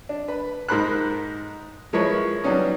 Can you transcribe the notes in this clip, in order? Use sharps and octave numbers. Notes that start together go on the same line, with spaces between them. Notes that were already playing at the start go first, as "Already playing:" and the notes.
D4
B4
G#2 D#4 A#4 C5 B5 F#6
F3 G#3 E4 A#4 B4 C#5
F#3 G3 B3 C#4 D#4